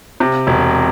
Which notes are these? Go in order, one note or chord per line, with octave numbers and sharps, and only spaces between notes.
C3
E1